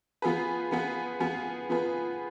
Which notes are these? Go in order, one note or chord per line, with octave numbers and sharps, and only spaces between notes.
F3 B3 F4 G#4 B4
F3 B3 F4 G#4 B4
F3 B3 F4 G#4 B4
F3 B3 F4 G#4 B4